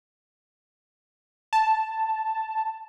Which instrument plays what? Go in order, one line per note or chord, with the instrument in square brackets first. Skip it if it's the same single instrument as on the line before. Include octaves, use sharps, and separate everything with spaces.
[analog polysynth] A5